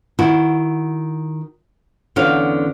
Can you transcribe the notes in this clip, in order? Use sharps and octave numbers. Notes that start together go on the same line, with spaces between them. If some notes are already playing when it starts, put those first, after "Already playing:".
D#3 E4 F#4
E2 D3 B3 C#4 F5